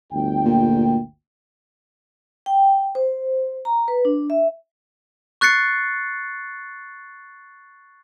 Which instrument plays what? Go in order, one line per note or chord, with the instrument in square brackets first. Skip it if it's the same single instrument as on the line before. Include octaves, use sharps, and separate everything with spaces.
[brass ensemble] G1 D2 G5
[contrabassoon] A#2
[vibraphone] G5
C5
A#5
B4
D4
E5
[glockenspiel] C#6 F#6 A6 C7 C#7